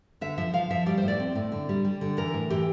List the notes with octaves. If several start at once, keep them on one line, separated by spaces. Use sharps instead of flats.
D3 E5
F3 E5
F3 F5
F3 E5
G3 D5
A2 C5
D5
C4
A2
D3
G3
G3
D3
E3 A#4
A2
E3 G4